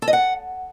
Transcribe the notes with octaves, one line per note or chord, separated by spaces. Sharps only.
A4
D#5
F#5